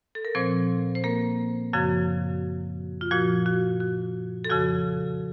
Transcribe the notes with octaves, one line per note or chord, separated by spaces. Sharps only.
A4
A#4
A#2 F3 C4 C5
C5
A#3 A#4
F#2 C#3 F3 F#4
F4
A#2 F3 F#4
F#4
F#4
A4
F2 C#3 F3 F#4